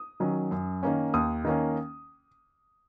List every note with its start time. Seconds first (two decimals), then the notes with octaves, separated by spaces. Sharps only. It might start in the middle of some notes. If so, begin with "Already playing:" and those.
Already playing: D#6
0.20 D#3 F#3 C#4
0.51 F#2
0.83 D#3 A#3 C#4
1.14 D#2 D#6
1.45 D#3 A#3 C#4